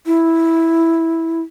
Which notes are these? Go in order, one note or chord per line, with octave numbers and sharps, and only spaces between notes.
E4